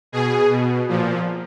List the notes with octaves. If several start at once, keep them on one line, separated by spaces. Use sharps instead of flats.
B2 G#4
B2
A#2 F3